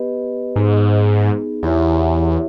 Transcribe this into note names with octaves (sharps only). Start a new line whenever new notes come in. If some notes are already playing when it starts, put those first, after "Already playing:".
Already playing: B3 G4 B4 D#5
G#2 B3 D#4 G#4
E2 E4 G4 C#5 E5